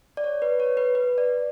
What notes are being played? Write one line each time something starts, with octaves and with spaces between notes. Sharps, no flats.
D5
C#5
B4
C#5
B4
B4
D5